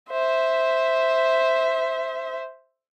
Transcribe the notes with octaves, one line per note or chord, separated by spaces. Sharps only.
C5 E5